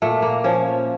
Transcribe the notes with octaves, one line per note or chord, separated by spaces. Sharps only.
A#2 A3
A#3
F3 C#4